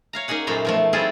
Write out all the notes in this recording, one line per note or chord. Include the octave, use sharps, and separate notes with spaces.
C#5 F5 A#5
A#3 C#4 D#4 G#4 F#5
F#2 A#2 A3 C5 A#5 B5
B2 F3 A3
G3 C4 E4 F4 G#4 A4